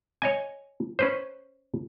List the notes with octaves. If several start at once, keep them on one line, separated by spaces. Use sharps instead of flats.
C#5 D#5 G#5
C#4 B4 C5